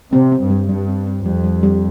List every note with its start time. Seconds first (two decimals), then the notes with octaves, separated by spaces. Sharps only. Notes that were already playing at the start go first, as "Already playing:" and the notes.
0.13 C3 C4
0.32 C4
0.41 G2
0.50 G3
0.69 G2 G3
0.88 C4
1.07 C4
1.26 F2 G3
1.44 G3
1.63 G3